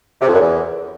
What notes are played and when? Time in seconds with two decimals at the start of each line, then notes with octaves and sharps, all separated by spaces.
0.21 C3
0.27 F2
0.33 F#2
0.40 E2